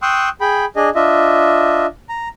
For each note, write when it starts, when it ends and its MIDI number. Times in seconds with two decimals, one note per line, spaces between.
0.02 0.29 79
0.02 0.29 84
0.02 0.29 85
0.02 0.29 87
0.02 0.29 88
0.02 0.29 90
0.41 0.65 68
0.41 0.65 79
0.41 0.65 83
0.76 0.90 62
0.76 0.90 68
0.76 0.90 75
0.95 1.86 62
0.95 1.86 65
0.95 1.86 75
0.95 1.86 76
2.09 2.28 82